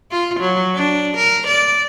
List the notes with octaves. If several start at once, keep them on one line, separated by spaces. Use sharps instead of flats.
F4
F#3
D4
A#4
D5